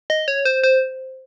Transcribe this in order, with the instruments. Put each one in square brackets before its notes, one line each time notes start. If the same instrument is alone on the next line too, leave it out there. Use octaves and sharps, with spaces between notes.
[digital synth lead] D#5
C#5
C5
C5